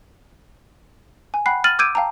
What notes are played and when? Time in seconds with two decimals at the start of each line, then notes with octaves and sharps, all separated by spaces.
1.34 G#5
1.46 F#5 G5 B5 F#6 C7
1.64 F6 A6 D#7 F#7
1.79 D6 E6 G6 G#6 D7 D#7
1.95 F5 G5 A5 A#5